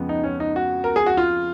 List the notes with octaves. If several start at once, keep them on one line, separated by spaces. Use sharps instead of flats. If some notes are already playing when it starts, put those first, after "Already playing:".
Already playing: F2 C#3 G#3 B3
D#4
C#4
D#4
F#4
A#4
G#4
F#4
F4